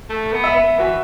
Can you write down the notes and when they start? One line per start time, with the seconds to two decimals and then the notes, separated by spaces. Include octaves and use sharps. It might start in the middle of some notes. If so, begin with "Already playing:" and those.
0.09 A3
0.33 B3
0.44 E5
0.56 B3
0.79 E3 F#4